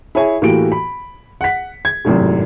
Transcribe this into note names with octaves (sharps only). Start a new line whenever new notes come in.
E4 G#4 C#5 G#5
A2 E3 A#3 F#4 G4 D7
B5
F#5 B6
G#6
G#1 F#2 A2 C3